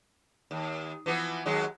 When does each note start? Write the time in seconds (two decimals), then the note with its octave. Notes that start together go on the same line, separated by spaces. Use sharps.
0.51 D#2
1.06 E3 F3 B3
1.46 D#2 F#3 G#3